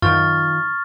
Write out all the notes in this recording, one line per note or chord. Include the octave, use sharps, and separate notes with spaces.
F#2 D#3 F4 C#6 F6 A6